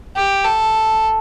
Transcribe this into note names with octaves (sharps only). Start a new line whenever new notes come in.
G4
A4